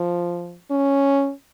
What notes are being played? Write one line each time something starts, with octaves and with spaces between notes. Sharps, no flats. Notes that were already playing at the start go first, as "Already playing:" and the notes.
Already playing: F3
C#4